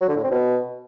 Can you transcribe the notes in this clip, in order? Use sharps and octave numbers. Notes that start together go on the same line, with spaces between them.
F#3
D3
A2
C4
B2